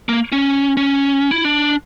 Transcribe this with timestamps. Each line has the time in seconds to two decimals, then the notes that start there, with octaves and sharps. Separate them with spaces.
0.09 A#3
0.32 C#4
0.77 C#4
1.31 E4
1.44 D4